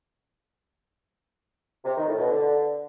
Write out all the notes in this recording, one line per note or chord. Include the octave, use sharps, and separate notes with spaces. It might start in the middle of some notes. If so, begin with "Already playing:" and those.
C3
D#3
A2
B2
D3